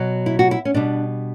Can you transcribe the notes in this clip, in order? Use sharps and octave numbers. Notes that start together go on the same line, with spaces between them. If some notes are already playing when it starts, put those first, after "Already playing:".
Already playing: B2 F#3
E4
F#4
E4
C#4
B2 G3 D4